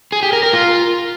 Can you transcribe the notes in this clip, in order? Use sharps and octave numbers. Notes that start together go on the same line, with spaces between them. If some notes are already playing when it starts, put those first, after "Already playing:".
G#4
G4
A#4
A#4
F4